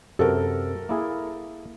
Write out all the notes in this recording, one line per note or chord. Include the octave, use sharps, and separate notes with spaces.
F#2 C3 F#4 A4 A#4
A#3 E4 G#4